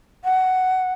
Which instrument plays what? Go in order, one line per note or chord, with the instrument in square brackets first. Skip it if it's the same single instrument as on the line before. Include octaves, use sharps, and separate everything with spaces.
[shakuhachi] F#5